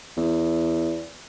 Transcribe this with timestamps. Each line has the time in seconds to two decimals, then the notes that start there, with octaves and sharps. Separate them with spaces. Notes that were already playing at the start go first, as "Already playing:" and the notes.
0.17 E2